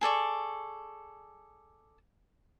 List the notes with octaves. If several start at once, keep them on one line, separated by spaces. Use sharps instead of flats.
G#4 A4 D5 C#6